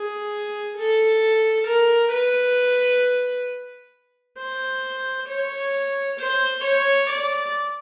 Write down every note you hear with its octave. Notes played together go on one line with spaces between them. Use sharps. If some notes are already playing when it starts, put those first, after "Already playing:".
Already playing: G#4
A4
A#4
B4
C5
C#5
C5
C#5
D5